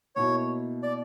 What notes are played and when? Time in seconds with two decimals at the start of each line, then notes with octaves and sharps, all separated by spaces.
0.16 B2 A#3 E4 C#5
0.83 D5